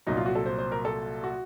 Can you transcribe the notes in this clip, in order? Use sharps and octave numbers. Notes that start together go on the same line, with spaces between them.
C2 A#2 F#3 D#4
F4
F#4
A4
C5
C5
A#4
A4
F#4